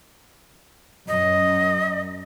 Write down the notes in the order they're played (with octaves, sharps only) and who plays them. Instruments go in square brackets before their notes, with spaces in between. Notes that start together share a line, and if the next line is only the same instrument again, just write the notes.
[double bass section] F#2 [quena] D#5